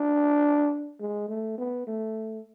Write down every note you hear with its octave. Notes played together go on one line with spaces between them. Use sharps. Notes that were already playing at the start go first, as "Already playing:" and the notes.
Already playing: D4
G#3
A3
B3
A3